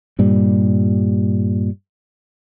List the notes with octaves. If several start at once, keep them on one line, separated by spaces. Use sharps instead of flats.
G2 A#2 G3